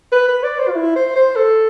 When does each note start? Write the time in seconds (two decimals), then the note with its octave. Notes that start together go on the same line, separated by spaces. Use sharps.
0.12 B4
0.28 B4
0.43 D5
0.59 C5
0.68 F4
0.75 E4
0.95 C5
1.16 C5
1.36 A4